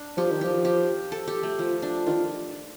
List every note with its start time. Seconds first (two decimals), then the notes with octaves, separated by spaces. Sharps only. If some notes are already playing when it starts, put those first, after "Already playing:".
Already playing: D4
0.17 F3 G4
0.31 D#3
0.41 F3 G4
0.65 G4
1.12 A4
1.28 G4
1.43 A3
1.59 F3
1.82 D4
2.07 D#3 F4